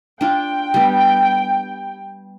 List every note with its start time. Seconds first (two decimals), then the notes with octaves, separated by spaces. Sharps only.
0.21 D4 F4 G5
0.74 G3 B3